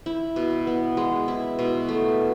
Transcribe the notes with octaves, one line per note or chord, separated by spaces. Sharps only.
E4
B2
B3
G#3
E4
B2
A3